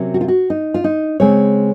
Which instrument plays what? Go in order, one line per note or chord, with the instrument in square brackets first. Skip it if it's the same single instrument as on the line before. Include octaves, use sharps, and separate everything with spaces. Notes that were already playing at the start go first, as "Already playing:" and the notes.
Already playing: [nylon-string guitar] C3 F#3 A#3 C#4
F#4
F4
F#4
D#4
F4
D#4
C#3 G#3 C4 C#5